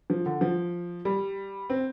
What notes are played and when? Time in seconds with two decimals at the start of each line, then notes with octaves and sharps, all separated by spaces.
0.10 F3
0.26 D3
0.41 F3
1.05 G3
1.70 C4